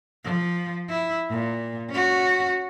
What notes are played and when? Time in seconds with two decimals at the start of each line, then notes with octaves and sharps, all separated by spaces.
0.24 F3
0.89 E4
1.30 A#2
1.90 C#4 F#4